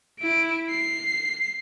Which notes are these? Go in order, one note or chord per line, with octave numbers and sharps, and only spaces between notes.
E4 D7
C7